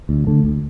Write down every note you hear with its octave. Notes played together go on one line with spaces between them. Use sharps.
D2
D3 A3
D2